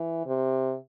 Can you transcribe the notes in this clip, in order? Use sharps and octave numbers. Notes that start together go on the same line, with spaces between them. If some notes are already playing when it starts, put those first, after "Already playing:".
Already playing: E3
C3